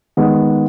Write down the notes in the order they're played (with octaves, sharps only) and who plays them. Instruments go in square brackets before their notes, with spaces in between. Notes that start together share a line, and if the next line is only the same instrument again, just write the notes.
[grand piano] D#3 G#3 B3